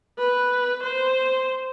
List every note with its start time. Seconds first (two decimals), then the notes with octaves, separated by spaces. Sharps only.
0.18 B4
0.83 C5